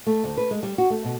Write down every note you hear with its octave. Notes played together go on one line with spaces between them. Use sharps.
A3
D2
B4
G#3
G3
F#4
A3
B2